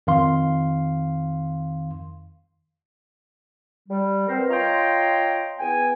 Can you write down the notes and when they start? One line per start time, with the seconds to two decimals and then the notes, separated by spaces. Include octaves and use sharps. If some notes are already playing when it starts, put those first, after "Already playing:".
0.07 F2 D#3 F5 C6
3.89 G3
4.28 B3 C4 A#4 C5
4.49 F4 C#5 D#5 G5 A#5 C6
5.59 E2 B3 G5 G#5